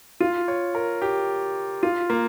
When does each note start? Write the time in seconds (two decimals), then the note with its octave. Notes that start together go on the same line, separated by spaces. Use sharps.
0.20 F4
0.48 C#5
0.75 A#4
1.02 G4
1.83 F4
2.10 A#3